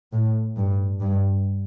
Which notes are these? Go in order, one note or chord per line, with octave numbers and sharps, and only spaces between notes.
A2
G2
G2